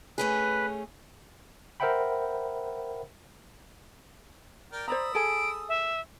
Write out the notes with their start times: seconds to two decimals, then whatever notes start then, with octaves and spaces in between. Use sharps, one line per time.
0.18 A3 C#4 G#4 B4
1.80 A#4 C5 E5 F#5 G5 B5
4.72 A#4 D5 G5
4.88 C5 D5 A#5 B5 D#6 E6
5.15 G#4 A4 G#5 D7
5.69 E5